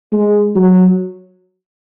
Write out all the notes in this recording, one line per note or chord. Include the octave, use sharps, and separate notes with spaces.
G#3
F#3